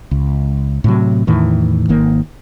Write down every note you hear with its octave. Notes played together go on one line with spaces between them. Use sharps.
C#2
A2 C3 F#3
E2 A2 D#3 E3
G#1 D#3 A#3